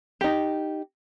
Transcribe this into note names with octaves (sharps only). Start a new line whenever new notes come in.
D#4 G4